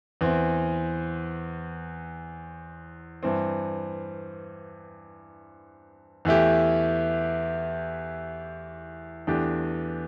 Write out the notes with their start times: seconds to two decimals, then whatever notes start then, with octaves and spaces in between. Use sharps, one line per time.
0.21 E2 E3 C4
3.23 G2 E3 C4
6.25 E2 E3 A3 E4 G4
9.27 E2 E3 A3 D4 G4